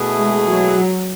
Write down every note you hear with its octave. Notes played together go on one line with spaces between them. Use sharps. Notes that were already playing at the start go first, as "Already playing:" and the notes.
Already playing: B2 A3 E4 G#4
G#3
F#3